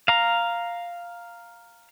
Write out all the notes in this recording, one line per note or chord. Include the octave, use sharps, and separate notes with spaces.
F5 A#5